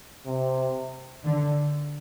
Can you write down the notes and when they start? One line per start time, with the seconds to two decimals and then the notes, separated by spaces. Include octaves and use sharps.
0.26 C3
1.24 D3